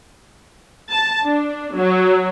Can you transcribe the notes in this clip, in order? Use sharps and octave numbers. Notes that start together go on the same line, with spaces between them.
A5
D4
F#3